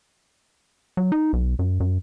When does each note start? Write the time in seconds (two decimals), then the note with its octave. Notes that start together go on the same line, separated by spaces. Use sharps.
0.97 F#3
1.12 D#4
1.33 B1
1.59 F#2
1.80 F#2